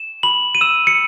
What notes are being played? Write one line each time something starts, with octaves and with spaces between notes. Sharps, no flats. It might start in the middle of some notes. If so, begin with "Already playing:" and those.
Already playing: E7
B5 F#7
D#7
E6 E7
C#7